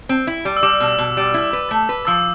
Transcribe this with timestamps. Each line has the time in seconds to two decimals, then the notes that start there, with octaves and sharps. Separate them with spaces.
0.09 C4
0.27 E4
0.45 G3
0.57 E6
0.63 G3 D6
0.80 B2
0.99 B2
1.17 G3
1.34 E4
1.53 B4
1.71 A3
1.89 B4
2.07 F3 E6